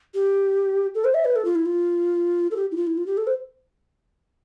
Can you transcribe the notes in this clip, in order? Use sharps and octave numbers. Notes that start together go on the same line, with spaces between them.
G4
A4
C5
E5
B4
A4
F4
E4
F4
A4
G4
E4
F4
E4
F4
G4
A4
C5